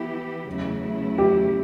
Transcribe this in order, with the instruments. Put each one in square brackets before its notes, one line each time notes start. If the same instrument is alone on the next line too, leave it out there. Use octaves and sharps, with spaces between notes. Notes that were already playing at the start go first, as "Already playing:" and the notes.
Already playing: [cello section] E3 B3 E4 G4
E2 C#3 F#3 A3 E4
[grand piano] G4